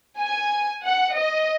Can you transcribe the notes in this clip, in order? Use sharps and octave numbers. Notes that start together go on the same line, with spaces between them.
G#5
F#5
D#5